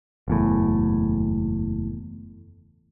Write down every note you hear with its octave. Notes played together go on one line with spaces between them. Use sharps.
F#1 E2 A2